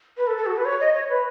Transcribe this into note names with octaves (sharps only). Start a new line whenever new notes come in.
B4
A4
A4
F#4
B4
C#5
D#5
C#5
B4